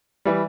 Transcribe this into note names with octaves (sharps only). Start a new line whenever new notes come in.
E3 G3